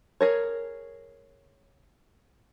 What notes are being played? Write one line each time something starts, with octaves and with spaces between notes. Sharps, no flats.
G#4 A#4 C#5